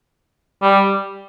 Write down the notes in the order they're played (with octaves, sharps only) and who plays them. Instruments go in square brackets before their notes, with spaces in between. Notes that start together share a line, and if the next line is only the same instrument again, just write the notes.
[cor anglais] G3